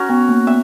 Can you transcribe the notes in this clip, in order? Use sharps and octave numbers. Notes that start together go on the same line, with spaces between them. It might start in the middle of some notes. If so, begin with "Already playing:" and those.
Already playing: C#4 F#4 A#4
B3
A#3
B3 E5